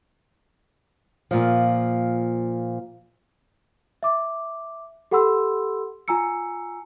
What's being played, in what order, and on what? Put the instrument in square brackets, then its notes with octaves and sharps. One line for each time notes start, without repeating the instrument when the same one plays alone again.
[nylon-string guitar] A#2 F3
[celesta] E5 D6
G4 A4 F#5 B5 C6 E6
F4 G#5 A#5 E6 C#7